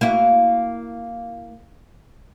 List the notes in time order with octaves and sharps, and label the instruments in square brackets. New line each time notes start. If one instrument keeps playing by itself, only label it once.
[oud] A#3 E4 F#4